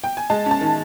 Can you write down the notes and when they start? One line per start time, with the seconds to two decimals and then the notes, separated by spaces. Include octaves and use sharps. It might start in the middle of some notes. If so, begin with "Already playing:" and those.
0.04 G5
0.17 G#5
0.30 G#3 A5
0.46 C#4 A5
0.61 D#3